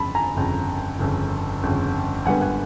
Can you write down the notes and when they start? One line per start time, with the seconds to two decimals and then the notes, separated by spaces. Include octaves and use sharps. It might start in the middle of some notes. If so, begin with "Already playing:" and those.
Already playing: G1 F2 C#3 A5 B5
0.15 G#5 A#5
0.36 G1 F2 C#3
0.99 G1 F2 C#3
1.63 G1 F2 C#3
2.26 G#1 F#2 D3 G3 B3 F#5 G#5
2.41 F#5 G#5